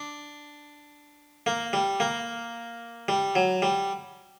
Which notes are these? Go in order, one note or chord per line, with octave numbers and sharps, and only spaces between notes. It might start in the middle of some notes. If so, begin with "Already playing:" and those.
Already playing: D4
A#3
G3
A#3
G3
F#3
G3